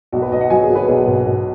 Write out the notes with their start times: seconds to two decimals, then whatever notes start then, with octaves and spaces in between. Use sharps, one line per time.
0.12 B1 F#4
0.22 B4
0.32 B1 D#5
0.41 F#5
0.50 F#3 G#5
0.63 G#4
0.69 F#3
0.75 B4
0.88 B1 G#4
1.07 B2
1.26 B2